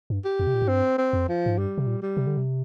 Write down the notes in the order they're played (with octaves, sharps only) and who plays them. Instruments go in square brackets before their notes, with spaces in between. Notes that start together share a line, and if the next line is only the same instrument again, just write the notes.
[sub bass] G2
[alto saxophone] G4
[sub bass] F2
C3
A#2
G#2
[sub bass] G2 [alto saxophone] C4
[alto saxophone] C4
[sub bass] F2
[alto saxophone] F3
[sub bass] G#2
[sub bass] G2 [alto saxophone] G3
[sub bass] C3
A#2
[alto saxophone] G3
[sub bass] C3
D3
C3